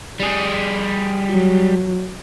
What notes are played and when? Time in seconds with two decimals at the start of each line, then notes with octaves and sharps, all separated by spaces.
0.20 G3 G#4
1.31 F#3